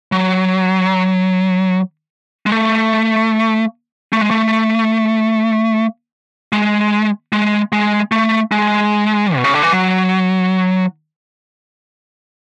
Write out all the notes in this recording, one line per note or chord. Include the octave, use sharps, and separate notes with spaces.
F#3
G#3
A3
A3
G#3
A3
G#3
G#3
G#3
A3
G#3
B2
C#3
D3
E3
F#3